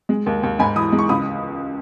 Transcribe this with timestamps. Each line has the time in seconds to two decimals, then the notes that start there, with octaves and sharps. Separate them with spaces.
0.09 G#3
0.26 D#2
0.43 D#2
0.59 G#2 G#5 B5
0.75 E3 B5 D#6
0.92 G#3
0.99 C#6
1.09 C#2 B5 D#6